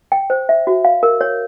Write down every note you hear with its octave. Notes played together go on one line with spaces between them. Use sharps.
G5
C5
E5
F#4
F5
A#4
C#5